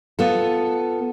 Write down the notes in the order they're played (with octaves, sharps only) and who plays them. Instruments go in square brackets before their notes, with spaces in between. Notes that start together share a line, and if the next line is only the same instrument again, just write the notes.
[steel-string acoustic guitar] B3 F4 A4